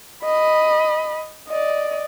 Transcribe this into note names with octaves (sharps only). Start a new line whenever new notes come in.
D#5 B5
D5 D#5